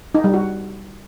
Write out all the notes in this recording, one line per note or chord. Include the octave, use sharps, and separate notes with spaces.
D#4
G3
F#4